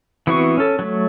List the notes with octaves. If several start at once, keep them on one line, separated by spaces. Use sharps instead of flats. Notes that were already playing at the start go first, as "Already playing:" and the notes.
E3 B3 C4 F#4 C#6
C#4 A4
F#3 A3